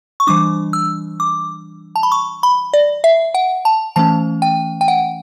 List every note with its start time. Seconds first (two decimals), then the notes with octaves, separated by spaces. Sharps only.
0.20 C#6
0.27 E3 G3 D4 D6
0.73 E6
1.20 D6
1.96 A5
2.03 B5
2.12 C#6
2.43 B5
2.73 D5
3.04 E5
3.34 F#5
3.65 A5
3.96 E3 A3 C#4 A5
4.42 G5
4.81 G5
4.88 F#5